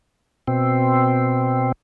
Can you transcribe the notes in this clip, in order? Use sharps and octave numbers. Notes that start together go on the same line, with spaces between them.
B2 C4